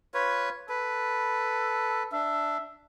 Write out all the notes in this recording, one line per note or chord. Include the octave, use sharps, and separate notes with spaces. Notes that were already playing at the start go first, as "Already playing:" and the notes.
F4 B4 C#5
A4 B4
D4 E5